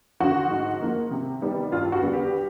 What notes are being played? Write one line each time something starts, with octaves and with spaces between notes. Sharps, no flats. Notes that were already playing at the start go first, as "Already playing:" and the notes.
D3 F3 F#4
G#2
F3 A#3
C3
D#3 G3 B3
G2 F4
F#4
D3 G3 B3
G4